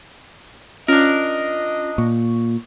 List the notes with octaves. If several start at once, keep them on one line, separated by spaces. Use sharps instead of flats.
C#4 D4 F4 A#4 D#5
A#2 C#6